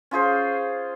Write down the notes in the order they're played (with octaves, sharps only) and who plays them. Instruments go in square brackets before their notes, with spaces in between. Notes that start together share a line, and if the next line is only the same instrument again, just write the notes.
[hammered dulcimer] C#4 F4 G#4 C5